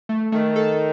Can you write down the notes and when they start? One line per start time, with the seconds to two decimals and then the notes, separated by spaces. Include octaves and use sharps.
0.09 A3
0.32 D#3 A3
0.56 A4